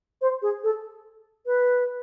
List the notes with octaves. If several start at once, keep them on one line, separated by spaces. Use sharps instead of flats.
C5
G#4
A4
B4